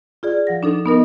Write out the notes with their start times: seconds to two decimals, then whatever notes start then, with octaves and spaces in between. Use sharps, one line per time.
0.23 F4 G#4 D5
0.47 F3 F#5 A#6
0.63 D4 D#4 A4
0.86 B3 D#4 A#4 D#5